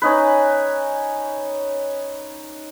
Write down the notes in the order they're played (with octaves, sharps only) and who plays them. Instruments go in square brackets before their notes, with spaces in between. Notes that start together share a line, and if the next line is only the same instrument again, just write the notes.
[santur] C#4 D#4 B4